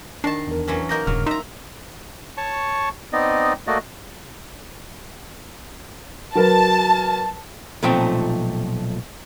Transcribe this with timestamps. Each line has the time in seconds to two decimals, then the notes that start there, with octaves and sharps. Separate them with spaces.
0.24 D#3 D4 A5 C7
0.47 E2 A#4
0.68 E3 F#3 C#4
0.89 A#3 D#4 A#4 G6 A#6
1.07 D#1 G2 C#3 F#3 F6
1.26 D#4 E5 A#5 C6
2.38 C#5 A5 C#6
3.13 B3 C4 D#4 D5 D#5
3.67 A3 A#3 F#4 D5 D#5
6.35 F#3 A#4 B4 A5
7.83 B1 A#2 F3 A3 C4 G5